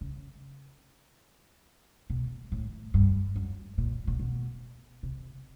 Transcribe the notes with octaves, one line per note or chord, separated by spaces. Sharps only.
C#3
B2
A2
G2
F#2
A#2
A#2
B2
C3